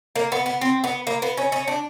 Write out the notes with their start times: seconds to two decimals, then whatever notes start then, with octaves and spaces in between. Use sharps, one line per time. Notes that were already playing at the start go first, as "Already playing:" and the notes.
0.16 A#3
0.32 B3
0.46 B3
0.61 C4
0.84 B3
1.07 A#3
1.22 B3
1.37 C#4
1.52 C#4
1.68 D4